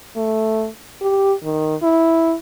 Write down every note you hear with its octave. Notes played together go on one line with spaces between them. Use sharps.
A3
G4
D#3
E4